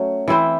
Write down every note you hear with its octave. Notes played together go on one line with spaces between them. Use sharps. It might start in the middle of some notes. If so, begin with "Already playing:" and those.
Already playing: F#3 A3 C#4
E3 C4 E4 C5